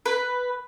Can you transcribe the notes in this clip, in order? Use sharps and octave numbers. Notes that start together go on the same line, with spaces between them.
B4